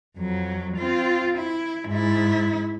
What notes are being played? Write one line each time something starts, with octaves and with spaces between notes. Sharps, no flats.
F2 F#3
C4 F4
E4
G#2 E4